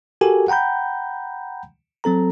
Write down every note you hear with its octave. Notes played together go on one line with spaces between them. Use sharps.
F#4 G4 A4 A#4 G#5
F#5 G5 A#5 B5 G6
F#3 C4 A4 A#5